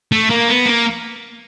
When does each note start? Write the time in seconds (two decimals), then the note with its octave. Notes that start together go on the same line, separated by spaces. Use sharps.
0.12 A3
0.30 A#3
0.48 B3
0.66 A#3